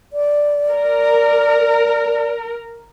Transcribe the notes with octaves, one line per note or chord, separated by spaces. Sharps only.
D5
A#4